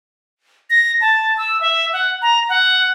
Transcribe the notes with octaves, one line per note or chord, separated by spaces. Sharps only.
A#6
A5
E6
E5
F#5
A#5
F#5